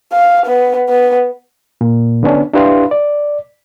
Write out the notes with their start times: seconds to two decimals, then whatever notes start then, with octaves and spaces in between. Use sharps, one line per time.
0.13 F5
0.47 B3
0.89 B3
1.81 A#2
2.23 D3 B3 C#4 D4
2.53 D4 E4 G4 B4 F5 C6
2.91 D5